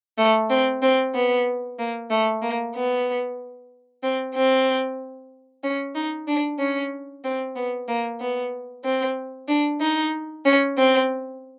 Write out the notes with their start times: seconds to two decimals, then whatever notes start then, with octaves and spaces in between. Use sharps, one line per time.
0.18 A3
0.50 C4
0.82 C4
1.14 B3
1.79 A#3
2.11 A3
2.42 A#3
2.75 B3
4.03 C4
4.35 C4
5.64 C#4
5.96 D#4
6.28 D4
6.60 C#4
7.24 C4
7.56 B3
7.89 A#3
8.20 B3
8.85 C4
9.48 D4
9.81 D#4
10.45 C#4
10.78 C4